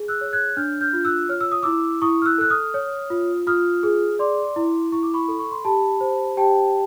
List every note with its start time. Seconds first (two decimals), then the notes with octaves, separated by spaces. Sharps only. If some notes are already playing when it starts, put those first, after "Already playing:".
Already playing: G#4
0.08 E6 F#6
0.21 C#5
0.33 F#6 G#6
0.57 D4 F6 G6
0.81 F6 G6
0.93 F4
1.05 E6 F#6
1.29 C#5 F6
1.41 E6
1.52 D#6
1.63 E4 D6 E6
2.02 E4 C#6 D#6
2.22 F6
2.26 E6 F#6
2.38 A4 F#6
2.50 D#6 F6
2.74 C#5
3.10 F4
3.47 F4 D#6 F6
3.83 G#4
4.19 D5 C6 D6
4.56 E4
4.92 E4 C#6
5.03 D6
5.14 B5 C#6
5.28 A4
5.39 C#6
5.51 C6
5.65 G4 A5 B5
6.01 C5
6.37 G4 G5 A5